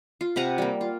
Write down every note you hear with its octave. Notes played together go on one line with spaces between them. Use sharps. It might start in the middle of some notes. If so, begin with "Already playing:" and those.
F4
C3 B4 F#5 A#5
G3 A#3
F4